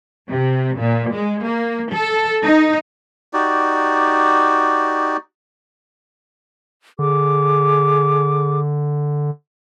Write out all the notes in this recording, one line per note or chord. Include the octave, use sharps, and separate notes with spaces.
C3
A#2
G#3
A#3
A4
D#4
D#4 F#4 G4 D5
D3 G#4 D6